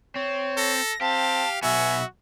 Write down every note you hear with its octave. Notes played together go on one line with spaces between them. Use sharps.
C4 C#5
A4 A#6
C4 G4 F5 A5
B1 B3 F#4 E5 G#5